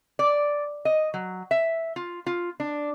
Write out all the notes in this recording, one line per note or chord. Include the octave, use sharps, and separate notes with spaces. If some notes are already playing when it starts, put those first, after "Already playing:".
D5
D#5
F#3
E5
F4
F4
D4